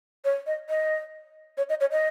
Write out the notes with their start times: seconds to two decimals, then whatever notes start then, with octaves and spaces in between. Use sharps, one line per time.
0.25 C#5
0.47 D#5
0.70 D#5
1.58 C#5
1.69 D#5
1.81 C#5
1.92 D#5